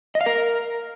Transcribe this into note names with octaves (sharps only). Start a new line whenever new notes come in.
D#5
F5
A#4